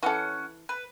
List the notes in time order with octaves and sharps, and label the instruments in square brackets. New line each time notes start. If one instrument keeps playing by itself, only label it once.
[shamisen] E3 A4 [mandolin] C#4 F#5
[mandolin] B4